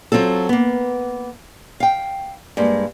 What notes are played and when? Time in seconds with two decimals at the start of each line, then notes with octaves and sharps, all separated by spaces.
0.12 F#3 C4 F4 A4
0.49 A#3 B3
1.80 F5 G5
2.57 G2 G#3 A#3